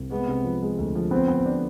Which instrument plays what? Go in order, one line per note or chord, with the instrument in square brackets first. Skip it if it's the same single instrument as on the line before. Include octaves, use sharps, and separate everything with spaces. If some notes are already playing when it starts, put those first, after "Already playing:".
Already playing: [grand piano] C2
[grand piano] G#3 [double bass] B3
[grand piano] C3
F3
G#3
D2
F3
[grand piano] B3 [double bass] C4
[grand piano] B3
D4